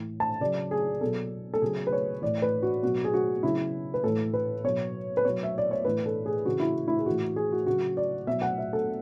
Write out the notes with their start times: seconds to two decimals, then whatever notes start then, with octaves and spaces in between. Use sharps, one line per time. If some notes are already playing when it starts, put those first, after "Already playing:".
Already playing: A2 E3
0.20 A5
0.40 C#3 F#3 D5
0.71 G#4
1.01 B2 F#3 A4
1.54 A4
1.62 C#3 F#3 G#4
1.87 B4
1.93 C#5
2.22 A2 E3 D5
2.42 B4
2.62 F#4
2.83 B2 F#3 F#4
3.04 G#4
3.14 F#4
3.43 C#3 F#3 E4
3.94 B4
4.04 A2 E3 A4
4.34 B4
4.64 B2 F#3 C#5
5.17 B4
5.25 B2 F#3 C#5
5.43 E5
5.58 D5
5.71 C#5
5.85 A2 E3 B4
6.06 A4
6.26 G#4
6.46 C#3 E3 F#4
6.60 E4
6.88 E4
6.99 G#4
7.06 A2 E3 F#4
7.36 G#4
7.52 F#4
7.67 C#3 F#3 F#4
7.97 D5
8.27 B2 F#3 E5
8.42 F#5
8.58 E5
8.73 A4